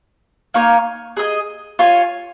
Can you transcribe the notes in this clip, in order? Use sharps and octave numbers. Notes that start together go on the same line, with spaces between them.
A#3 D#4 C#5 G#5
G#4 D#5 G#5
F4 C#5 G#5